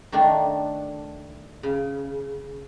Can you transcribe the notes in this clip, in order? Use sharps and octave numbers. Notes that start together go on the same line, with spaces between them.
D#3 A3 D4
C#3